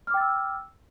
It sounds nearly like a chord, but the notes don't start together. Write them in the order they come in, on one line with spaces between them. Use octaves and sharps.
F6 D6 G5 A6 E6